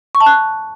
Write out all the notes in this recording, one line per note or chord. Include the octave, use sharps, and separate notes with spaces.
C#6
A5
F#6